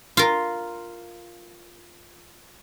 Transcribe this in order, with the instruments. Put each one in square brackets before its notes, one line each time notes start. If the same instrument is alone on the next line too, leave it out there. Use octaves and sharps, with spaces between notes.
[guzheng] F4 A#4